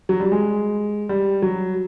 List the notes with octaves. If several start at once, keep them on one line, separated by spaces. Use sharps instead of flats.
F#3
G3
G#3
G3
F#3